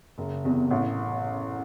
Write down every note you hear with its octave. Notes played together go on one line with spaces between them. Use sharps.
F#1
E2 C3
A1